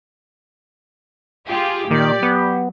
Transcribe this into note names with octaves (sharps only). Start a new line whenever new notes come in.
F4 G4 G#4
A#2 D#3 G4 D5
F#3 B3